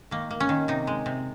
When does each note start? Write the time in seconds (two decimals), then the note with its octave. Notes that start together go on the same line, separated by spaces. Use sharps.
0.11 D#3 A#3
0.31 A#3
0.40 C#4
0.49 D#3
0.68 C3 D#4
0.87 G#3
1.06 C3